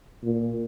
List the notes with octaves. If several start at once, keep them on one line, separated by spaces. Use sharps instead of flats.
A#2